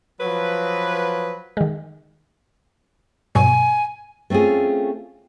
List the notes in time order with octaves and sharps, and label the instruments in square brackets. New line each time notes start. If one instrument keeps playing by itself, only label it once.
[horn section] F3 F#3 B4
[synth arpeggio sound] D#3 G#3
[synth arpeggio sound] G2 B2 F#3 [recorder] G#5
[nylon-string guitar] A3 C4 C#4 F4 G#4